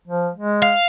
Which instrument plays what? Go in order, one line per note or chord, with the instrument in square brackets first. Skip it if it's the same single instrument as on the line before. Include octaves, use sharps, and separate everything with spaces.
[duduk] F3
G#3
[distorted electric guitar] F5